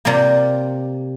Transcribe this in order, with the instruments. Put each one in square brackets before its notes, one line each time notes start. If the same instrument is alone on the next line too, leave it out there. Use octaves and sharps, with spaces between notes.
[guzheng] C3 G3 A#3 F4